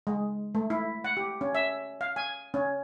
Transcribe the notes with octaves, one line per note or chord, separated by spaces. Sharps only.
G#3
A3
E4
F#5
G4
C#4
E5
F5
G#5
C#4